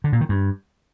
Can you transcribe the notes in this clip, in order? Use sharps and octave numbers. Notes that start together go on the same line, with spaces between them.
D3
A#2
D#3
G2